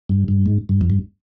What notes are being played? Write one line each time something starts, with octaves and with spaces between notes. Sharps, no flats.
G2
G2
G#2
G2
F2
G2